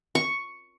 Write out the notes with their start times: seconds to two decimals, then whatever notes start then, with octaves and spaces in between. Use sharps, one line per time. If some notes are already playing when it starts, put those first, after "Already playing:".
0.15 C#6